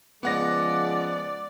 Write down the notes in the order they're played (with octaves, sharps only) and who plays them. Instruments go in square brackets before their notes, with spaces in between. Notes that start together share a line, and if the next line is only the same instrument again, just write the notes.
[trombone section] C#3 F3 G#3 [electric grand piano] B3 F#5 A#6 [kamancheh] D5